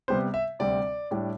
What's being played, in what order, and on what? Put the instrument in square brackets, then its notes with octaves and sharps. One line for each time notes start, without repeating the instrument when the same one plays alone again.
[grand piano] C3 G3 B3 C5
E5
D2 C3 G3 C4 D5
A2 G3 D4